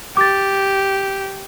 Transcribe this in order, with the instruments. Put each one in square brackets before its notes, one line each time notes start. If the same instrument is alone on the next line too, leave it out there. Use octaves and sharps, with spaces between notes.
[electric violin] G4 [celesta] D6 A6